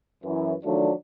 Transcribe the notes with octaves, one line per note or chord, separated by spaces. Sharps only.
F#2 E3
D#3 F3 F#3 A3 D4